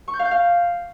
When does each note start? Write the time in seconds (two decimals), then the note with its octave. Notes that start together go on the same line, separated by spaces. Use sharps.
0.08 C#6
0.13 G6
0.19 F5
0.25 G6
0.31 F5